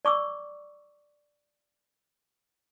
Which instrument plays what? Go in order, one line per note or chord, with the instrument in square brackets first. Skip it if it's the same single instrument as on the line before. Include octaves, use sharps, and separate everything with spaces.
[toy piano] D5 C#6 D6 E6